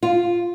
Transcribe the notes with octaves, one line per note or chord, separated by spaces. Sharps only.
F4